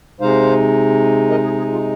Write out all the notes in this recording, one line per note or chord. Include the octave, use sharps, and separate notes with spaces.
C3 G#3 D#4 C5 F5
A#4 D#5
G#4
G#4
F4